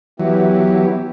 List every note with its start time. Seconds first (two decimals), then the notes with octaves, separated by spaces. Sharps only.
0.20 E3 F#3 B3 E4 G4